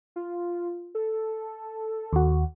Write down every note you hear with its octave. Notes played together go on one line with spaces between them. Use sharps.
F4
A4
D#2 F#4